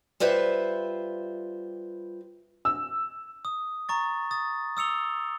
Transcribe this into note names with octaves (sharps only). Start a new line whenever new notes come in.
G3 F4 B4 C5 E5
E6
D#6
A#5 C#6 A6
D#6 A6
D#6 E6 C#7 F7 G7